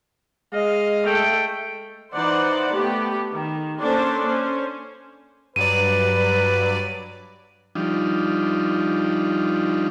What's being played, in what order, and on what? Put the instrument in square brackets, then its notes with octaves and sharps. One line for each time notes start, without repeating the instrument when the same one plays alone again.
[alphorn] G#3 [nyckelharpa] D#5 [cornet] F5
[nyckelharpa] A3 [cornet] G5
[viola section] E3 D#4 C5 D5 F#5
A3 B3 G4
D#3
A#3 C#4 D4 A4 C5
C#4 C5
[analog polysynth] G2 F#3 D5 [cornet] B4 [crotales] D#7
[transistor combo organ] F3 G3 D4 D#4 F4